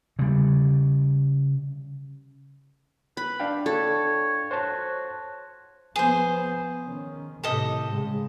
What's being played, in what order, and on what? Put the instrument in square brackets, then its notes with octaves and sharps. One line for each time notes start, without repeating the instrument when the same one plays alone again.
[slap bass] C#3 G3
[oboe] B4 [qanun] B5
[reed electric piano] D4 F5 G5
[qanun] A4 [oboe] C#5
[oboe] F#4 [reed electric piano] C5 C#5 A5
[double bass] F3 B3 [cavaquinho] G#4 C5
[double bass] D#3 C#4
[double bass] A2 C3 [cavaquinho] G4 A4 D#5
[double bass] C#3 G#3